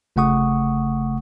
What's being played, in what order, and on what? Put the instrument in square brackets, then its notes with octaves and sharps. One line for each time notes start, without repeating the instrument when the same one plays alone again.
[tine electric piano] G1 C#3 A3 F#5 C#6 D#6